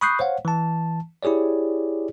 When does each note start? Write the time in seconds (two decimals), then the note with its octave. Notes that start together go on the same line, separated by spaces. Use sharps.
0.01 B5 C#6 D#6 F#6 G6 C7
0.19 C5 C#5 F5 F#5
0.45 E3 A5
1.23 E4 G4 G#4 C#5 D5